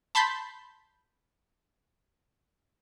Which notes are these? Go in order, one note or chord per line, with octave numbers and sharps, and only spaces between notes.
A5 B5 C6 G6 B6